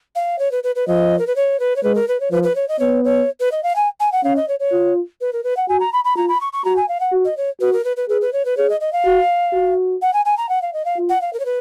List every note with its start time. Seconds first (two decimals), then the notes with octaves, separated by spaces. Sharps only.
0.15 F5
0.39 C#5
0.51 B4
0.63 B4
0.75 B4
0.87 F3 D#5
1.19 A#4
1.27 B4
1.36 C#5
1.59 B4
1.76 C#5
1.83 G#3 B4
1.95 A#4
2.08 B4
2.20 C#5
2.31 F3 B4
2.43 B4
2.55 C#5
2.68 D#5
2.79 B3 C#5
3.04 C#5
3.40 B4
3.51 D#5
3.63 F5
3.76 G#5
4.00 G#5
4.12 F#5
4.23 C#4 F5
4.36 D#5
4.48 C#5
4.59 C#5
4.72 F4
5.21 B4
5.33 A#4
5.44 B4
5.57 F#5
5.68 F#4 G#5
5.80 A#5
5.93 B5
6.04 B5
6.16 F4 A#5
6.28 B5
6.41 C#6
6.53 C#6
6.65 F#4 A#5
6.76 G#5
6.88 F5
7.00 F#5
7.12 F#4
7.25 D#5
7.37 C#5
7.60 F#4 B4
7.73 A#4
7.84 B4
7.96 B4
8.08 G#4 B4
8.21 B4
8.33 C#5
8.45 B4
8.57 G#4 C#5
8.69 D#5
8.80 D#5
8.93 F5
9.05 F#4
9.53 F#4
10.02 F#5
10.13 G#5
10.25 G#5
10.37 A#5
10.49 F#5
10.62 F5
10.73 D#5
10.85 F5
10.97 F4
11.09 F#5
11.21 F5
11.33 A#4
11.40 C#5
11.45 B4